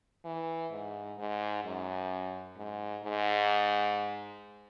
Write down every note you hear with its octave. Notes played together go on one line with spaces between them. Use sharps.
E3
G#2
G#2
F#2
G#2
G#2